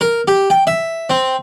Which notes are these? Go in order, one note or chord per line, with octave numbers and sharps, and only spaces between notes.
A#4
G4
G5
E5
C4